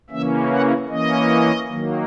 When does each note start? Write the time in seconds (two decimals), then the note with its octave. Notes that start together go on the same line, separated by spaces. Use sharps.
0.10 C#3 E3 A#3 C#4 E5
0.50 F#5
0.89 E3 A#3 C#4 D#5
1.67 D#3 F#3 A#3